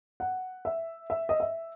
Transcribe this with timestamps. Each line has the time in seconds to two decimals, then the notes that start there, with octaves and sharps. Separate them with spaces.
0.20 F#5
0.65 E5
1.10 E5
1.29 D#5
1.40 E5